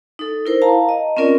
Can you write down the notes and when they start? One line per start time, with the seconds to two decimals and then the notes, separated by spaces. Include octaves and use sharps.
0.19 D#4 A4
0.46 E4 A#4 C5
0.62 F5 A5 A#5
0.89 D#5
1.17 C4 C#4 F4 A#4 D5